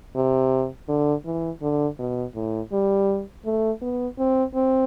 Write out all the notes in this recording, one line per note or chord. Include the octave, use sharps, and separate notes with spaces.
C3
D3
E3
D3
B2
A2
G3
A3
B3
C4
C4